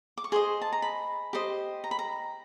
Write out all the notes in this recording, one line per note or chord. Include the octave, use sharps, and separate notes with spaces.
D6
C#6
G#4 C5 D#5 C6
A5
A#5
B5
G4 C5 D#5
A#5
B5
A#5